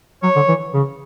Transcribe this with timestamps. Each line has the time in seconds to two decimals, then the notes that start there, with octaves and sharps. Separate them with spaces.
0.23 F#3 C#5
0.36 D3
0.48 E3
0.74 C#3